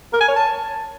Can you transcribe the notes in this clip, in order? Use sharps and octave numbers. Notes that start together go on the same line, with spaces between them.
A#4
G#5
C#5
A5